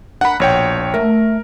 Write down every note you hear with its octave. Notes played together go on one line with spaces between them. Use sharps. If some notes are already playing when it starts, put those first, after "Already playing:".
D4 A#4 F#5 B5
A#1 B2 C#5 G5
A3 A#4 E5